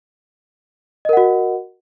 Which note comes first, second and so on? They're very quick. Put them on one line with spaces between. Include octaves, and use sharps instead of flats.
D#5 A#4 F#5 F#4